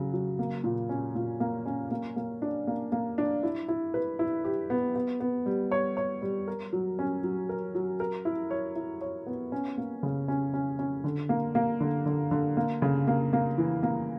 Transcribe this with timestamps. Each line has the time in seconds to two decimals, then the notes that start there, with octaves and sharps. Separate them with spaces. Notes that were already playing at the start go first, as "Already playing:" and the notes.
Already playing: C#3 F#3
0.13 F#3
0.39 A#3
0.64 A#2
0.89 C#4
1.15 A#2
1.40 A#3
1.66 C#4
1.91 A#3
2.16 A#3
2.42 D4
2.67 A#3
2.92 A#3
3.18 D4
3.43 E4
3.68 E4
3.94 B4
4.19 E4
4.44 G4
4.70 B3
4.96 B3
5.20 B3
5.46 G3
5.72 C#5
5.97 C#5
6.22 G3
6.48 A#4
6.73 F#3
6.99 C#4
7.24 F#3
7.49 A#4
7.75 F#3
8.00 A#4
8.25 E4
8.51 C#5
8.76 E4
9.01 C#5
9.27 B3
9.52 C#4
9.78 A#3
10.03 C#3
10.28 C#4
10.54 C#4
10.79 C#4
11.04 D3
11.29 A#3
11.55 A#3
11.81 D3
12.06 D3
12.31 D3
12.57 A#3
12.82 C#3
13.07 A#3
13.33 A#3
13.58 E3
13.83 A#3